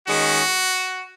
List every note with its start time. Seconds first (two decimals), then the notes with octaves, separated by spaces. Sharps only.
0.09 D#3 G#3 C#4 F#4